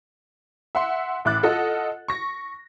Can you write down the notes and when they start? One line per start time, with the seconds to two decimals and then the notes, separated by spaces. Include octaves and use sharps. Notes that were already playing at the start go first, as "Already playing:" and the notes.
0.75 E5 F#5 C6
1.25 A1 A2 E4 D6 F#6 A6
1.43 F4 A4 D#5 F#5
2.08 C#6 A#6